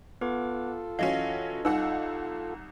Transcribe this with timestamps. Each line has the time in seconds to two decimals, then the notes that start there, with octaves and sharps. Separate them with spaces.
0.21 B3 F4 A4 B4 D6
0.99 E3 F#3 C#4 D#5 F5
1.65 C2 D#4 F#5 E6